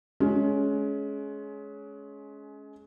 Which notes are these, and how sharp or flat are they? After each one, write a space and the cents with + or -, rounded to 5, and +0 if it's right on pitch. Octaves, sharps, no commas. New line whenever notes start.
G#3 +25 C#4 +15